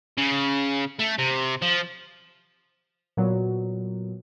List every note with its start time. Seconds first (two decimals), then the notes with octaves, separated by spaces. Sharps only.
0.17 C#3
0.99 A3
1.19 C3
1.62 F3
3.17 A#2 F#3 B3